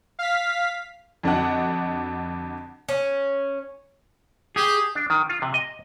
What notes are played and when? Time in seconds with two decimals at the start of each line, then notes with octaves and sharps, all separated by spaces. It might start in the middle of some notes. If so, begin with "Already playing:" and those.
0.19 F5 B6
1.23 F2 D3 D4 F#4 D#5 F#5
2.89 C#4
4.56 G4 G#4
4.95 D4
5.10 D#3
5.29 F4
5.42 C3
5.54 D#5